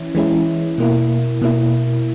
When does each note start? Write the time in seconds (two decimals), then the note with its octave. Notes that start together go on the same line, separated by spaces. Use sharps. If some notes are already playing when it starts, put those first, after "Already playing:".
Already playing: E3 C#4 E4
0.15 E3 G#3 C#4 E4
0.78 B2 A#3 E4
1.42 B2 A#3 E4